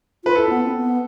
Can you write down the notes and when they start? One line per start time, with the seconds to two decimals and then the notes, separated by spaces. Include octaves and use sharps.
0.24 F4 B4
0.35 E4 A4
0.49 B3
0.63 C4
0.76 B3